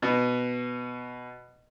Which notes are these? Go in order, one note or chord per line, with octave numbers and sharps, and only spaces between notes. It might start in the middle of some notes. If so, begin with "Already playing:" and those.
B2 B3